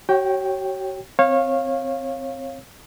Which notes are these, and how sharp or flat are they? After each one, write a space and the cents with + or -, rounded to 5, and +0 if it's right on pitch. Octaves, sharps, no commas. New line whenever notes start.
F#4 +45 C#5 -15 G5 +0
C4 -5 C#5 -25 F5 +0